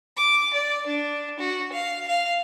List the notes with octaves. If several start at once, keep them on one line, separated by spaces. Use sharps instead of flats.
D6
D5
D4
F#4
F5
F5